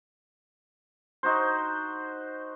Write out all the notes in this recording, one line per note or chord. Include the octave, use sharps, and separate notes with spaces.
D#4 F#4 C5